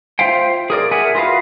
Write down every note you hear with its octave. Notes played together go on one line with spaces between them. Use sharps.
F4 C5 E5 F5 G5
G#4 A#4 D5
G#4 A#4 E5 F#5 G#5
F4 F#4 B4 D#5 F5